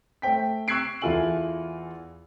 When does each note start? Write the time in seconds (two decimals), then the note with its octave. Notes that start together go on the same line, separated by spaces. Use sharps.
0.22 A3 C5 G5 B6
0.68 C#6 E6 F#6 G#6 C7 D7
1.02 E2 E4 F4 A4 G#5 F#7